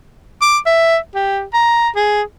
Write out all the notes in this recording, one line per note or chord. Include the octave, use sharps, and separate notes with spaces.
D6
E5
G4
A#5
G#4